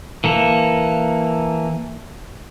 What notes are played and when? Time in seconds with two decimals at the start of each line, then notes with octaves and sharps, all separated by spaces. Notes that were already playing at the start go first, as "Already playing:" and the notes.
0.24 E3 A#3 A4